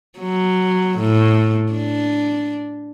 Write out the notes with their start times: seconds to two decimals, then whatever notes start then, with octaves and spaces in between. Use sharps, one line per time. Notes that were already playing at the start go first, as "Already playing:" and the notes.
0.19 F#3
0.98 A2
1.72 D4